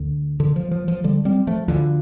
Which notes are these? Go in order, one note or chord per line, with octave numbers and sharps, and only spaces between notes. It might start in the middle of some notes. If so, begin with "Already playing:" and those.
Already playing: D2 D3
D3
F3
F3
F3
D3 G3
G3 C4
F3 A3
D2 D3 F3